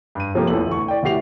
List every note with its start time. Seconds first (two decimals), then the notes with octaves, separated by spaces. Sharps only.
0.15 G2 D#7
0.34 C3 F3 A3 A#3 G4
0.47 A1 E2 A4 F#7
0.67 D2 E3 C#6
0.88 D5 G5
1.03 D1 E4 F#4 G4 C7 F7